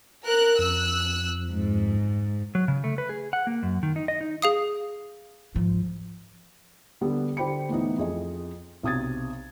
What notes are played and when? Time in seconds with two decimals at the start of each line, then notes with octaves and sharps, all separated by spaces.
0.25 A#4 F#6
0.59 F2 E6 F#6
1.51 G#2
2.55 F#3
2.68 C#3
2.84 A3
2.98 B4
3.09 G#4
3.33 F#5
3.47 A#3
3.63 F#2
3.83 D#3
3.96 D#4
4.08 D#5
4.21 D#4
4.42 G#4 F5 D#6
5.55 G#2 F3
7.01 D3 G3 B3
7.37 D3 G4 C5 G5 B5 C#7
7.69 A2 E3 B3 D#4
7.98 F2 G#4 D#5
8.83 B1 C3 D#6 G#6 A6